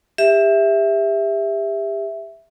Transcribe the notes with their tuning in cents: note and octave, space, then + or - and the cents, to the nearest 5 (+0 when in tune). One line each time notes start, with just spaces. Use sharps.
G4 +30 E5 +0